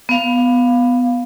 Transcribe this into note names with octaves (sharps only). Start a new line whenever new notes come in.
B3 F5